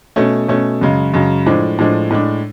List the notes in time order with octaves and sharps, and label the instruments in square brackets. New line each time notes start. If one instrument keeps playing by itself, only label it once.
[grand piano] B2 A3 C#4
B2 A3 C#4
F#2 C#3 G#3
F#2 C#3 G#3
A2 F3 G#3 D4
A2 F3 G#3 D4
A2 G#3 D4